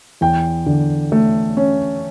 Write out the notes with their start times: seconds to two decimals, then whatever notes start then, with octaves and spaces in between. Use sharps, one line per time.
0.21 E2 G5
0.66 D3
1.12 A3
1.57 C#4